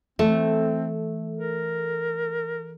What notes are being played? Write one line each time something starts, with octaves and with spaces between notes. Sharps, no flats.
E3 A3 C4 A4
A#4